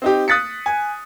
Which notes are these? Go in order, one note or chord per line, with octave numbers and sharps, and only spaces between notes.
C4 D#4 G4
D#6 F#6 A6 B6 C#7
G#5